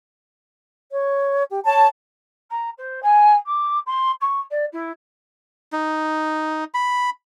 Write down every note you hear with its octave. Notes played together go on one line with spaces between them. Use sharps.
C#5
G4
C#5 A5
A#5
C5
G#5
D6
C6
C#6
D5
E4
D#4
B5